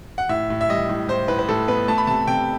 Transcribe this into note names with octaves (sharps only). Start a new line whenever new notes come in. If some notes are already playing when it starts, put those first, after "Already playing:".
F#5
A2 E5
A2
E5
G3 D#5
A2
A2 C5
A2 B4
B4
A2 A4
B3 B4
A3 A5
B5
C3 A5
C3 G5